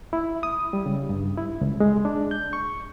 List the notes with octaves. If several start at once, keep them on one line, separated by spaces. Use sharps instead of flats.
E4
D#6
G3
C#3
G2
E4
C#2
G#3
D4
G6
C#6